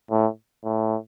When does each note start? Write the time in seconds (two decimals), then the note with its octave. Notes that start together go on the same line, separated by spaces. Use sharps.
0.11 A2
0.64 A2